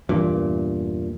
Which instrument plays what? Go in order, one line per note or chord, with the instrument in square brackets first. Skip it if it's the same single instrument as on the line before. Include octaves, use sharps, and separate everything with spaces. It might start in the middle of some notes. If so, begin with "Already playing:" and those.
[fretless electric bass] E2 G2 [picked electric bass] A#2